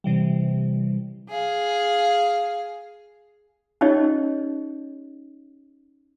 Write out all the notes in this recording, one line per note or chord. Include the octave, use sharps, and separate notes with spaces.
C3 E3 G3
G#4 F5
C#4 D#4 G4 C#5 D#5